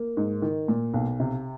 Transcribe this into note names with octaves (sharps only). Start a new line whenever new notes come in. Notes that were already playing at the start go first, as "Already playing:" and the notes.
Already playing: A#3
G#2
D#3
A#2
B1
C3